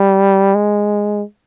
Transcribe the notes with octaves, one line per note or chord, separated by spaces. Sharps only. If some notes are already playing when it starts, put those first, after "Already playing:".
Already playing: G3
G#3